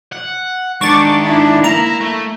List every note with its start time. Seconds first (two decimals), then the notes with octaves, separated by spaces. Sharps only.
0.12 F#5
0.81 G#2 D#3 D4 C#6 D6 A6
1.24 D4 E4
1.64 A#3 E4 A#5
2.01 A3